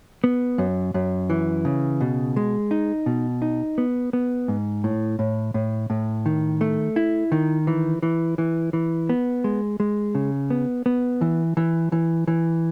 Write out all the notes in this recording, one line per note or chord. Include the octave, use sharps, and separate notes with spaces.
B3
F#2
F#2
E3
C#3
B2
G#3
D#4
B2
D#4
B3
B3
G#2
A2
A2
A2
A2
D#3
A3
E4
D#3
E3
E3
E3
E3
B3
G#3
G#3
C#3
B3
B3
E3
E3
E3
E3